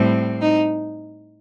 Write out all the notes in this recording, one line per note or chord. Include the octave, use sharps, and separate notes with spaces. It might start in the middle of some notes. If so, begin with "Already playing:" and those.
Already playing: A2 G3 C4
D#4